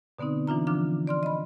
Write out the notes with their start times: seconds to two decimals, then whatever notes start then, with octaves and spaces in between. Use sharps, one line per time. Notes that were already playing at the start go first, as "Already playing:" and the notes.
0.19 B2 D3 B3 C4 D#4
0.47 E3 D4 F4 A#5
0.67 D3 F3 D4 D6 F6
1.07 D5 C6 F6
1.23 D#5 B5